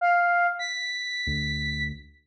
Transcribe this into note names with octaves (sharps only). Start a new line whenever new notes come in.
F5
B6
D2